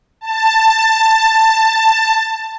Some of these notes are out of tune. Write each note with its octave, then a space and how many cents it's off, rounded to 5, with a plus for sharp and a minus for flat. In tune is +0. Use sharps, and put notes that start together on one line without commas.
A5 +15